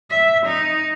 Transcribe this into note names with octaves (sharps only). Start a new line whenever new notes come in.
E5
D#4